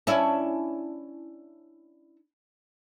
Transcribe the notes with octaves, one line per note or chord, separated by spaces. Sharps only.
C#4 D4 E4